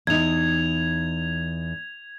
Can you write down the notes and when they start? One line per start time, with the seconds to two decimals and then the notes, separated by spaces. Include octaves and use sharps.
0.07 E2 D#4 G#6 F7